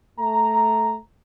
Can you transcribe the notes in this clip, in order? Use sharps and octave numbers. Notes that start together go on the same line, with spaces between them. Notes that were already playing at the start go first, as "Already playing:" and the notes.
A3 A#5